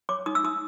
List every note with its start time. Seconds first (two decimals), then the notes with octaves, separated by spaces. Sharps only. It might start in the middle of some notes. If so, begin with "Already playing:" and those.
0.09 C#5 D6
0.26 D#4 D#6
0.35 E6
0.44 D#4 D#6